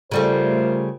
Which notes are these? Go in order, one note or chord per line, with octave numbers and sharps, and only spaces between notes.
C#3 G3 A3 F4 A#4 C5